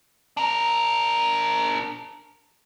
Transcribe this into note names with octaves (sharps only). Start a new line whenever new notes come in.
D4 A#4